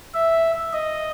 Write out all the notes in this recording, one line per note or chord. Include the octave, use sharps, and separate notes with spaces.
E5
D#5